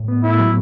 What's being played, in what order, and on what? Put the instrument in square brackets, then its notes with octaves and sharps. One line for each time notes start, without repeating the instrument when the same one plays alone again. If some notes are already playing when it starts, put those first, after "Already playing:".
Already playing: [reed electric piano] A2
B3
[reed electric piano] A2 [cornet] E4
[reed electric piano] F#3